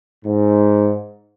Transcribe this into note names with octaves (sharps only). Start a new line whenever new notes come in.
G#2